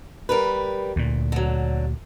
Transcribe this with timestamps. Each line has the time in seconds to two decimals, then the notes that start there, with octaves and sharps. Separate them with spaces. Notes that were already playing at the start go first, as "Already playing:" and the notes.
0.29 G3 A#4 B4
0.96 D2 A#2
1.32 D3 F#3